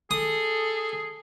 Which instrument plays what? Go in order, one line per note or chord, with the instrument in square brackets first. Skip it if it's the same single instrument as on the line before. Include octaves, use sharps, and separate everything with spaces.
[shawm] G#4 [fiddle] A4 [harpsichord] D#6